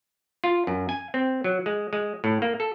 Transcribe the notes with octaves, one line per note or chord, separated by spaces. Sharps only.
F4
F#2
G#5
C4
F#3
G#3
G#3
A2
A#3
A4